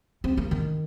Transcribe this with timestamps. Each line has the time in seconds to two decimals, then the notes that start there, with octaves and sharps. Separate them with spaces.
0.24 C4
0.37 A#3
0.51 D#3